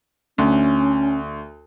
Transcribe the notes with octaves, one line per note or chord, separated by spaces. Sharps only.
D2 C#4